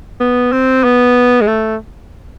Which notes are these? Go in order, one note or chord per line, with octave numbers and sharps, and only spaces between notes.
B3
C4
B3
G#3
A3